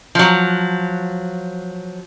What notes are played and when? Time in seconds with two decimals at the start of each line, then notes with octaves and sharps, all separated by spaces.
0.15 F3 F#3